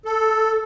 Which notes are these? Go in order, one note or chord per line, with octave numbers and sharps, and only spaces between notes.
A4